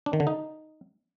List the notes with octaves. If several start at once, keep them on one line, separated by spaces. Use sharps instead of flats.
D4
D#3
D3
D#4